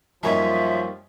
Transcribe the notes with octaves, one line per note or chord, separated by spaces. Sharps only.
F#2 F3 G3 A#3 D#4 C#5 D#5 E5